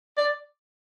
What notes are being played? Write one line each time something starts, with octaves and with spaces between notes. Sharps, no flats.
D5